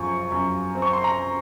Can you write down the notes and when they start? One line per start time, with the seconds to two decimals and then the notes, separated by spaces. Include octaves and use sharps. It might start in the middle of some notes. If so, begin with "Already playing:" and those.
Already playing: F#2 F3 C4 C#6
0.32 F#2
0.75 C4
0.82 C#6
0.93 C6
1.04 A#5